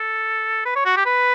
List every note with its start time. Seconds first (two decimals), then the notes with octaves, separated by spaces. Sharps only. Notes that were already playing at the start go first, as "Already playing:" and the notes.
Already playing: A4
0.66 B4
0.76 C#5
0.86 F#4
0.97 G4
1.06 B4